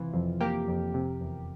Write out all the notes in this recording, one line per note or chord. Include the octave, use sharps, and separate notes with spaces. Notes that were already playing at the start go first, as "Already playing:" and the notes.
Already playing: C3 E3 F4
F2
A#3 G4 A#4
F2
C3
E2